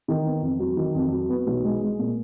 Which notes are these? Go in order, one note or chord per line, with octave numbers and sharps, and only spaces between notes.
D#3
B3
F2
F#3
D#3
F2
F#3
B3
B1
G#3
G#3
A#2